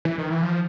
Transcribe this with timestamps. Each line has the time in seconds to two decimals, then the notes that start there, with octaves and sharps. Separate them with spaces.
0.05 E3
0.18 D#3
0.30 E3
0.43 F3